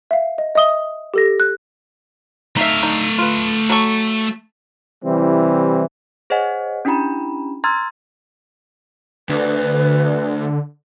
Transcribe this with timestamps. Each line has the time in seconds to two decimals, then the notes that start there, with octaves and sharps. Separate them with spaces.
0.11 E5 F5
0.38 D#5
0.55 D#5 E5 D#6 G7
1.14 G4 A4 A#6
1.40 F#6
2.56 A3 D#4 E5 F5
2.83 D3 D#4
3.18 F4 B4
3.69 F#3 A4 C#6
5.04 C3 E3 G3 C4 E4
6.30 G#4 C5 C#5 D#5 F#5 G#5
6.85 C#4 D4 E4 G4 A#5 B5
7.64 A#5 C6 E6 F6 G#6 A6
9.29 D2 D3 B4